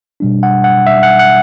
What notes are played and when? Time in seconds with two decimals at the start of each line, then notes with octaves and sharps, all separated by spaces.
0.20 B2 G3 D4
0.43 F#5
0.64 F#5
0.87 E5
1.03 F#5
1.19 F#5